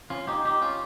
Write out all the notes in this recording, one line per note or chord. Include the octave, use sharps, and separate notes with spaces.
C#4 F4
D#4 G4
D#4 G4
C#4 F4